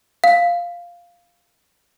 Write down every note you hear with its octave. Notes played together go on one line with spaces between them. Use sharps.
F5